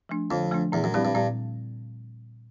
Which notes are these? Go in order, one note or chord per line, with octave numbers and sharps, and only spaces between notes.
F3 A3 D4
F2 D3
F3 A3 D4
E2 A#2
F#2
G2 G3 C4 E4
G2
G2 A#2